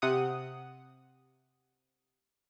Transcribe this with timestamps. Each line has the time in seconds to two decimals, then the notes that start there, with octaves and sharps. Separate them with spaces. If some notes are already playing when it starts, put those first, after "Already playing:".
0.02 C3 F#5 D#6